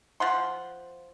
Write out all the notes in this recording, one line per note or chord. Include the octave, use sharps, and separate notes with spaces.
F3 F#5 C6